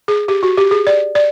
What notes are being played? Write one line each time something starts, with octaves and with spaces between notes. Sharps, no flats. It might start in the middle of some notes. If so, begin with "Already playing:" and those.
G#4
G4
F#4
G4
G#4
D5
D5